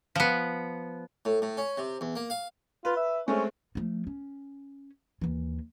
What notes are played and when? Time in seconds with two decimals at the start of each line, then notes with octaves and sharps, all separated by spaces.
0.15 F3 B3
1.25 A2
1.42 A2
1.57 C#4
1.78 C3
2.01 E2
2.16 A#3
2.30 F5
2.85 F4 B4
2.97 E5
3.28 G#3 A3 C4 C#4
3.75 F3 A3
4.07 C#4
5.21 D#2 E3